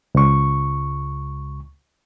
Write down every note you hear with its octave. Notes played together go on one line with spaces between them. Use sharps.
C#2 C#6